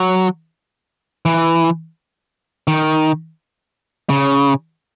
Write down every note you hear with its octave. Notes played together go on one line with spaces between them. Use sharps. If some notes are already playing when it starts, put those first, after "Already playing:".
Already playing: F#3
E3
D#3
C#3